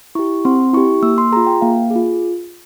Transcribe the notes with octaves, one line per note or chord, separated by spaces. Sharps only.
E4 G4 C#6
C4 C6
E4 G4 C#6
A#3 E6
C6
F4 G#4 A#5
G5
A#3 F5
F4 G#4